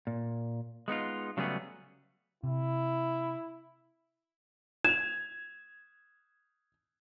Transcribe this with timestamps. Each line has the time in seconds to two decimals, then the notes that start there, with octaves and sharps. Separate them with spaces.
0.07 A#2
0.88 G#3 B3 D#4 F4
1.37 C#3 F#3 G3 A3 B3 G#4
2.43 C3 E4
4.85 G#6 E7 F7